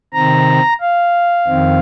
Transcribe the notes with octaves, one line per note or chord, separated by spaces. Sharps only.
C3 D#3 C4 A#5
F5
F2 D#3 C4